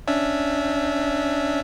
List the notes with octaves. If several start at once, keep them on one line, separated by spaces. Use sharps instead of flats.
C#4 D4 E5